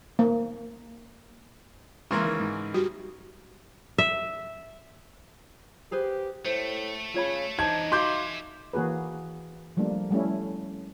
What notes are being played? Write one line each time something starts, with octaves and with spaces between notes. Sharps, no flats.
A#3
C#3 E3 G#3 A#3 C6
D#3
G#2
G3 F#4
E5
G4 G#4 B4 C5
A2 A3 C5
C#3 F4 C#5 B5
E3 D4 D#4 C5 A5 G#6
F#4 E5 F5 G#5 C6 D6 G6
E3 A#3 F#4 G#4 B4
F3 G3 A3 A#3 D4
G3 A3 C#4 E4